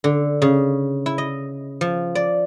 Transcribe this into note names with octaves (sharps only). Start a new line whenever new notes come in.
D3
C#3
E4
D#5
F3
D5